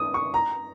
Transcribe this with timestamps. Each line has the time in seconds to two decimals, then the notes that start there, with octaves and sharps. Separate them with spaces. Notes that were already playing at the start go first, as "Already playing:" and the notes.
Already playing: D#6
0.14 C#6
0.34 A#5